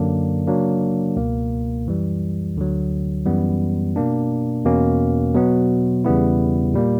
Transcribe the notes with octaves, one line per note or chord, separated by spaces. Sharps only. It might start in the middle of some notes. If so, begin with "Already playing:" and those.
Already playing: F#2 D3 F#3 A#3 D4
C#3 F#3 A#3 D4
C#2 B2 A#3
F#2 E3 G3
D2 D3 F#3
F#2 E3 G3 B3
B2 A#3 D4
E2 B2 A#3 C#4
B2 F#3 B3
E2 C#3 G3 B3 E4
A#2 G3 A#3